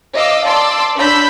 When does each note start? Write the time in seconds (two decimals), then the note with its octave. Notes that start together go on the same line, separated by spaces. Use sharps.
0.14 D#5 F5 D6 E6
0.46 D5 A5 C6 D6 E6
0.96 D4 C#5 B5 E6 G6 B6